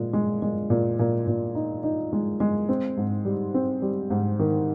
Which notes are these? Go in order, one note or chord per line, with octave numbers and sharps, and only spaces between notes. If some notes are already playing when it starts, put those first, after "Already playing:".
Already playing: A#2 G#3
G#3
G#3
A#2
A#2
A#2
D#4
D#4
G#3
G#3
C4
G#2
G3
C4
G3
G#2
D#3